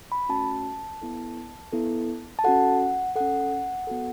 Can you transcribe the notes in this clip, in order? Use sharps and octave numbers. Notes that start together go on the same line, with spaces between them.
B5
A3 C#4 F#4 A5
B3 E4 A4
B3 E4 A4
A5
C#4 F#4 A4 F#5
C#4 A4 F#5
B3 F#4 A4